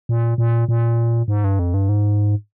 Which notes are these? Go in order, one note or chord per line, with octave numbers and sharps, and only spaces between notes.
A#2
A#2
A#2
G#2
G2
F2
G2
G#2